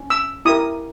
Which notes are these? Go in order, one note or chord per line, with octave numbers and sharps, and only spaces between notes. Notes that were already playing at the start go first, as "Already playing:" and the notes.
Already playing: C#4
E6
E4 G4 A#4 D#6